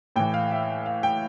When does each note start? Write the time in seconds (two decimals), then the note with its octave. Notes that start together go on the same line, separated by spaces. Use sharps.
0.16 A2 E3 G5
0.34 F5
0.51 E5
0.86 F5
1.03 G5